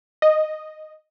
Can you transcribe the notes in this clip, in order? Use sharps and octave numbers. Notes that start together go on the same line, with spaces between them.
D#5